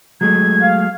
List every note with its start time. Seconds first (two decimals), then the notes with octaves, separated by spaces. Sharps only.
0.21 F#3 G#3 A3 G#6
0.62 F5